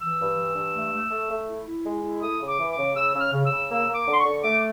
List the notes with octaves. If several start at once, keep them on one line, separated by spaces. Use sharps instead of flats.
E3 E6
G2
E3
G2
A3
A3
A3
A3
E4
E4
G#3
E4
A3 D#6
C#3
D6
E3
D6
C#3
C#3 E6
C#3
F6
C#3
E6
C#3
A#3 E6
A#3
D6
D3 C6
C#6
D3
A3 D6